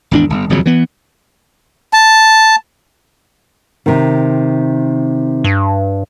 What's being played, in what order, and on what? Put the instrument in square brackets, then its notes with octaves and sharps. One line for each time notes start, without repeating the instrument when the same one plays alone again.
[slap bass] G#1 E2 D4
G1
D#1 F2 C#3 F#3
E3 B3
[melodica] A5
[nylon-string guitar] C3 D#3
[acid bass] G2